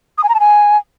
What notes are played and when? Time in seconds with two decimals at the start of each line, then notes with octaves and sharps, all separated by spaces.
0.18 D#6
0.23 G#5
0.29 A#5
0.34 A5
0.40 G#5